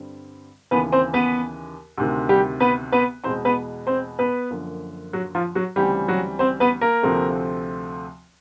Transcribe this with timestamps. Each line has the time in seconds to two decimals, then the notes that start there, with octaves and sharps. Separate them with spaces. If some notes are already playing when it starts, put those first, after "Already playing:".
Already playing: G2 D3 G3 C4
0.71 D#2 C#3 E3 B3 B4
0.92 C4 C5
1.14 B3 B4
1.98 D2 C3 D#3
2.29 G3 G4
2.60 B3 B4
2.92 B3 B4
3.24 E2 B2 G#3 C4 C5
3.45 B3 B4
3.87 C4 C5
4.19 B3 B4
4.51 F#2 D3 F3 A#3
5.13 F#3 F#4
5.35 F3 F4
5.55 F#3 F#4
5.76 D2 C#3 E3 G3 C4 G4
6.08 F#3 F#4
6.39 C4 C5
6.60 B3 B4
6.81 A#3 A#4
7.03 D2 C3 F3 A3 C4